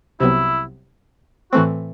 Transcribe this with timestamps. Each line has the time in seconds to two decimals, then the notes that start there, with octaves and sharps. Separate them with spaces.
0.20 C2 C3 F#3 B3 E4
1.53 A2 E3 A3 C4 F#4